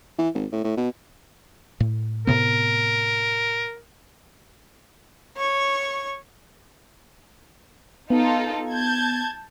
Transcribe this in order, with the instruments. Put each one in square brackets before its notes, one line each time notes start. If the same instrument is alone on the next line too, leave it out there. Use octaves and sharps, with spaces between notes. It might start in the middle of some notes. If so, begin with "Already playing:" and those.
[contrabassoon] E3
G#1
A2
A2
B2
[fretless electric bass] A2
[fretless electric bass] A2 C3 B3 [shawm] A#4
[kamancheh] C#5 C#6
[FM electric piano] B3 [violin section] D#4 F4 A4
[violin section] A5 G6 G#6